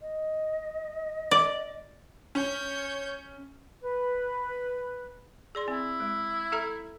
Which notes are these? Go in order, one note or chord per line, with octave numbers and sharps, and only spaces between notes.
D#5
D5
C#4 C#5 G6
B4
G#4 D5 C6
C4 E4
G#3
A4 E5 A#5